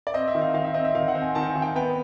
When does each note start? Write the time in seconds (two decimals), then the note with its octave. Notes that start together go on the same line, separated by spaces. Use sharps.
0.07 D5
0.14 C4 D#5
0.28 E5
0.35 D#3
0.42 F5
0.54 D#3 F5
0.64 E5
0.74 C4 D#5
0.85 E5
0.95 D#3 F5
1.08 F#5
1.15 C4
1.22 G#5
1.35 D#3 A5
1.49 G#5
1.56 D#3
1.62 G5
1.76 B3 G5